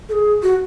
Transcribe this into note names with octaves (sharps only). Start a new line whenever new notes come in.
A4
G#4
F#4